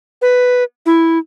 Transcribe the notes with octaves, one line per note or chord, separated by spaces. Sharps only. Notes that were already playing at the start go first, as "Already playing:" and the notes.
B4
E4